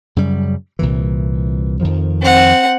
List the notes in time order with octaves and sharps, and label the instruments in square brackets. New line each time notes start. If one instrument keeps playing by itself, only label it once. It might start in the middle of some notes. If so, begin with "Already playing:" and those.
[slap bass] F#2 C#3 G3
C2 A#2 E3
F2 D#3 F3
[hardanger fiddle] C4 F#5